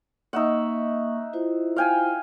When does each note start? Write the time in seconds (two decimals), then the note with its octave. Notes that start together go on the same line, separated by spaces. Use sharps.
0.33 A#3 D#4 D#5 E5 F#5 C#6
1.33 E4 F4 C5
1.76 F5 G5 G#5